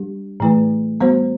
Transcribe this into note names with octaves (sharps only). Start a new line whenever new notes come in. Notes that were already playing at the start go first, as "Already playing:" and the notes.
Already playing: G3 D4 G4
A2 E3 A3 E4 B4
G3 B3 F#4 C5